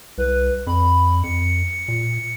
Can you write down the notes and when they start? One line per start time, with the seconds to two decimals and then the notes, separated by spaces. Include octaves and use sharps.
0.18 C2 B4
0.67 F2 B5
1.23 F2 C#7
1.70 C#7
1.88 A#2